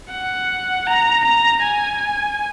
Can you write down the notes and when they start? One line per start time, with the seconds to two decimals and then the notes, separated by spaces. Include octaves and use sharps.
0.11 F#5
0.87 A#5
1.25 A#5
1.63 G#5